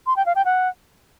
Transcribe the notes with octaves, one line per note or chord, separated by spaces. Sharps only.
C6
G5
F5
G5
F#5